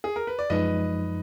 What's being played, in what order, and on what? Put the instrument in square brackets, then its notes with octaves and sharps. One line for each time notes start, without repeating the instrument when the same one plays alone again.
[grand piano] G#4
A#4
B4
D5
[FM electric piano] F#2 F3 G#3 D#4 [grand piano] B4 D#5